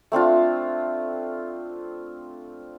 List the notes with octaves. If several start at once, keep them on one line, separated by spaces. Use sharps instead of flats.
A3 C4 D4 F4